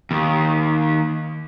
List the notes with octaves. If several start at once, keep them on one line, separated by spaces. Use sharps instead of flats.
D#2